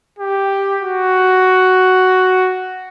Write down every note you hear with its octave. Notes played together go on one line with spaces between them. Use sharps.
G4
F#4